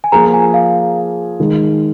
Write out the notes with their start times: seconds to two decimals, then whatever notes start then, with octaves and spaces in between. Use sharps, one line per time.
0.04 G#5
0.12 F3 A#3 F4 G#4 A#5
0.34 G#5
0.54 F5
1.40 D#3 G#3